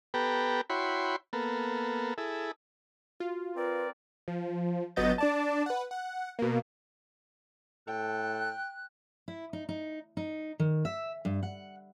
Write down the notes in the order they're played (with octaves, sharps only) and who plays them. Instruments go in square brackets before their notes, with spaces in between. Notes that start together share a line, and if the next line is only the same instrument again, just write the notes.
[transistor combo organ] B3 G4 A4 B4 G5 A#5
E4 F#4 C#5 G5 B5 C6
A#3 B3 A4
E4 G#4 A4
[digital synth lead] F4 [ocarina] F#4
[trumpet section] C4 A#4 D5 [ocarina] B4
[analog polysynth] F3
G1 F#3 B3 D#5 G6 A6
D4 D5 A5
B4 F#5
F#5
B2 A#3
[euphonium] A2 [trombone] A4 [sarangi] G5 [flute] F#6
[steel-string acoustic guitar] E4
D#4
D#4
D#4
D#3
E5
G2
F#5